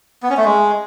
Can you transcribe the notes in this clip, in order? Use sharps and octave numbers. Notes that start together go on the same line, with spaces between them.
B3
C#4
A3
G#3